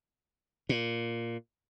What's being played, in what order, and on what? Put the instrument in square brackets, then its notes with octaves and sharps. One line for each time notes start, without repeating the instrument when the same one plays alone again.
[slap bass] A#2